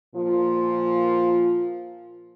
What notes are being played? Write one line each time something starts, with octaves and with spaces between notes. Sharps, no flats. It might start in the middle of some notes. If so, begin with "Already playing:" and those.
A#2 F3 F4